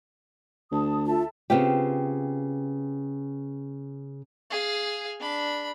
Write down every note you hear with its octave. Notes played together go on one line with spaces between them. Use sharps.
D2 A5 D#6
F4 A4 E5 A5
C#3 B3 C4 F4 G4
G#4 F5
D4 B5